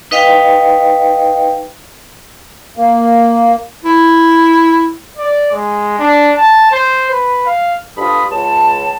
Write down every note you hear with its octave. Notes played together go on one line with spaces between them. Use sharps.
D#4 B4 D#5 F5 G5
A#3
E4
D5
G#3
D4
A5
C5
B4
F5
G2 F4 A4 B5 D#6
C#2 A5